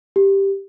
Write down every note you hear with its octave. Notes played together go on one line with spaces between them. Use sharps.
G4